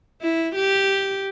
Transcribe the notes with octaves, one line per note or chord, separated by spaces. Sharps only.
E4
G4